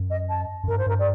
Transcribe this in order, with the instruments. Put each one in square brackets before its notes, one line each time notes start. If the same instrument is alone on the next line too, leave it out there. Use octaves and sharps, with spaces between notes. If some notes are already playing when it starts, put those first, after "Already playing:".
Already playing: [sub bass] F#2
[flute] D#5
A5
[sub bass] F#2
[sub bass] G2 [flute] A#4
[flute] C5
[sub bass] G2 [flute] A#4
[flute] D5